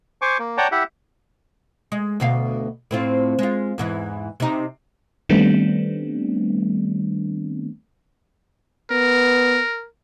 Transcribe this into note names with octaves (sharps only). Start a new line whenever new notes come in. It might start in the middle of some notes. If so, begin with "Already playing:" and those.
C5 G#5 C#6 D6
A#3
C#5 D5 F#5 G5 A5 A#5
E4 G4 E5 F#5
G#3
D2 B2 F5
A2 C4 F4
G#3 F4
E2 G#2 E3
C3 D#4
D#3 G3 A3 B3 C4 D4
B3 A#4